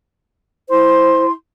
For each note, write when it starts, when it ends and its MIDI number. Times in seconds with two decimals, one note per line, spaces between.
0.69 1.29 64
0.69 1.26 72
0.69 1.29 84